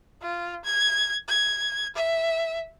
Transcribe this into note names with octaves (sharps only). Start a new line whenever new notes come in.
F4
G#6
G#6
E5